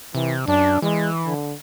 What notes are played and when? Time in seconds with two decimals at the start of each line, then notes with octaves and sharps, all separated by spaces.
0.15 C3 E3
0.48 F#2 D4
0.82 E3 G#3
1.26 D3